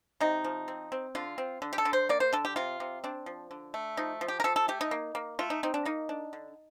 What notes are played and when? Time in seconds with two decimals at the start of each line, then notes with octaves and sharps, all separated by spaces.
0.20 C3 D#4
0.44 F3
0.68 C4
0.92 C4
1.15 D3 F4
1.38 C4
1.62 D3
1.73 G4
1.78 A4
1.85 D3
1.93 C5
2.09 A#3 D5
2.20 C5
2.33 D3 A4
2.45 G4
2.56 C3 F4
2.80 C3
3.04 C4 D4
3.26 F3
3.51 D3
3.74 A3
3.97 F3 D#4
4.21 F3
4.28 G4
4.40 A#4
4.44 F3 A4
4.56 A4
4.68 A3 G4
4.81 D#4
4.91 A#3
5.15 A#3
5.39 A3 F4
5.50 D#4
5.63 C4 D#4
5.74 D4
5.85 A#3 D#4
6.09 D4
6.33 D3